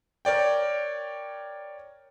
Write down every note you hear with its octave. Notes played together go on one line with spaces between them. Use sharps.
A#4 C#5 D5 G5